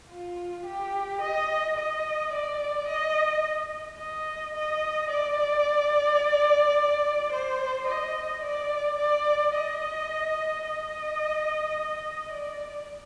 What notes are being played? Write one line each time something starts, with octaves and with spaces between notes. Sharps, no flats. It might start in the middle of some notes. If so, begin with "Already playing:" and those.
F4
G4
D#5
D#5
D5
D#5
D#5
D#5
D5
C5
D#5
D5
D5
D#5
D#5
D5